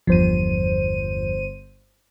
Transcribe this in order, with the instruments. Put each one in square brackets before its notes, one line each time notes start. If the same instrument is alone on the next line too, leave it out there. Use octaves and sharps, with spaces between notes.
[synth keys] G1 C5 D#7 [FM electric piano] E2 G2 F3